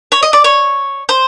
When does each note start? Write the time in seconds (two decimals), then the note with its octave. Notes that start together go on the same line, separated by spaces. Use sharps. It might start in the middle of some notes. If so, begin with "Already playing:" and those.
0.12 C#5
0.23 D#5
0.33 D5
0.44 C#5
1.09 C5